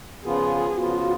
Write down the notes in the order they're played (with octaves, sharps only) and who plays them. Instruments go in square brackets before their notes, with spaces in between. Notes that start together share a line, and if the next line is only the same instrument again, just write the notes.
[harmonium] C#3 F3 B3 F4 [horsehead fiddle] G#4
[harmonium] C#3 F3 B3 F4 [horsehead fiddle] F#4